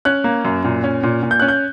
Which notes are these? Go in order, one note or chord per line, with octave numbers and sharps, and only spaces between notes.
C#4 F#6
A#3
F#2
A#2
C#4
A#2
A#2
G6
C#4 F#6
G6